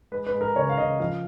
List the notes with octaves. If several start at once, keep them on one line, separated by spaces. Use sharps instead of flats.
G#3 B4
B4
G#3
A#4
C#3 C#5
F5
C#3 D#5
F3 F5